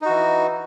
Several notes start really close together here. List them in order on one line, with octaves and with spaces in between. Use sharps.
D#4 F#4 E3